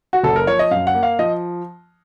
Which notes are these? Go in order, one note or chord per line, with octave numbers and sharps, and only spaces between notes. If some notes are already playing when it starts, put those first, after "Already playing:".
F#4
F#1 A4
A#4
F3 C#5
D#5
F#2 F5
F#5
A#3
F5
F3 D#5